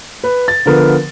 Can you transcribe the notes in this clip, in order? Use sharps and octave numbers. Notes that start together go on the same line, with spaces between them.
B4
A6
D3 F3 B3 A#4